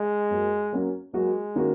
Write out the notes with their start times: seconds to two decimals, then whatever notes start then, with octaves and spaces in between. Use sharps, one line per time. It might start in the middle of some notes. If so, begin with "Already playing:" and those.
Already playing: G#3
0.30 F#2 F#3 A#3 F#4
0.73 F#3 A#3 C#4 F#4
1.14 F#3 G#3 A#3 F#4
1.56 D#3 A#3 C#4 F#4